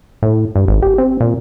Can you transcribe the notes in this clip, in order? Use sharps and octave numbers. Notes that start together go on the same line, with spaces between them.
A2
G2
G#1
G4
C4
A#2